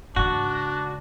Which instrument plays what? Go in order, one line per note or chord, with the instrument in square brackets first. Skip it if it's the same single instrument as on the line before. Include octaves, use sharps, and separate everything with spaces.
[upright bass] G#2 C#3 [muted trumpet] D4 [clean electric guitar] F#4